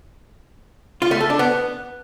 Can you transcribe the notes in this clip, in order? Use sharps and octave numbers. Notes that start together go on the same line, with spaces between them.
F4
A3
A4
D4
B3